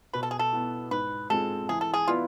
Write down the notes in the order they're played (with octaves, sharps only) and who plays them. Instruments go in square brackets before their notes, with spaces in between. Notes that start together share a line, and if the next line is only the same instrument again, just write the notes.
[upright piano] B2 [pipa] B4
[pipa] A4
G#4
A4
[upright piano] B3 E4
[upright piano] G#2 [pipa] B4
[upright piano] G#3 C4 F4 G#4 [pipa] A4
[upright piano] E3 [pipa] G#4
[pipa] A4
G#4
[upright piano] B3 E4 B4 D5 [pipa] F4